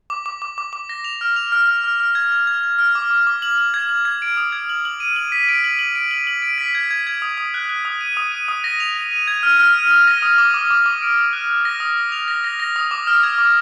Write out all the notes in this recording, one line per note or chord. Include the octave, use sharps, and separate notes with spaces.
D6
D6
D6
D6
D6
A#6
F7
F6
F7
F6
F6
F6
F6
G#6
G#6
G#6
G#6
F6
D6
D6
D6
F#7
F#7
G#6
F#7
G#6
D7
D#6
G#6
F#7
F#7
D#7
F#7
B6
D7
F#7
F#7
D7
F#7
F#7
D7
B6
G#6
G#6
G#6
D#6
D#6
F#6
F#6
D#6
D#7
D#6
D#7
D#6
A#6
F7
A#6
D#7
G#6
F6
F6
D#7
D#6
A#6
D#6
D6
D6
D6
D6
D7
D#6
F#6
F#6
A#6
D#6
A#6
F7
A#6
A#6
A#6
D#6
D6
F6
G#6
D6